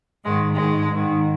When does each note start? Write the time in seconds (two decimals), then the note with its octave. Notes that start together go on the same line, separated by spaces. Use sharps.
0.24 G#2 D#3 G#3
0.56 G#2 D#3 G#3
0.88 G#2 D#3